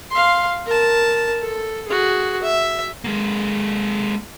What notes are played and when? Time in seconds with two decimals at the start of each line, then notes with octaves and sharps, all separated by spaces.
0.10 F5 C6
0.66 A#4 A5
1.42 A4
1.88 F#4 G#4
2.42 E5
3.04 G#3 A#3